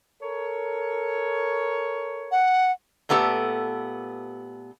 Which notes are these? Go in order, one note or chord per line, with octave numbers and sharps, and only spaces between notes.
A4 A#4 C#5
F#5
A#2 A3 B3 G4 A4